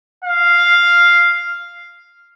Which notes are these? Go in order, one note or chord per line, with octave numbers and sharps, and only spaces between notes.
F5